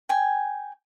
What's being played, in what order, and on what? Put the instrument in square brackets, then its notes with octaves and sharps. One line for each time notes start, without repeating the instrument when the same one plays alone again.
[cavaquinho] G5 G#5